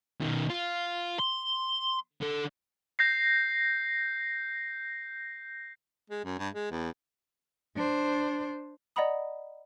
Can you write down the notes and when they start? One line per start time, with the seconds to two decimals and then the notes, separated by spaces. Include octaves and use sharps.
0.21 B2 D#3
0.50 F4
1.19 C6
2.21 D3 A4
2.99 G6 A#6 C7
6.10 G#3
6.25 F#2
6.39 G2
6.54 G#3
6.71 E2
7.76 D4 C5
8.96 D5 D#5 F#5 A#5 B5 D#6